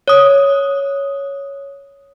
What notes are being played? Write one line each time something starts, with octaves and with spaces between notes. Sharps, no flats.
C#5 D#6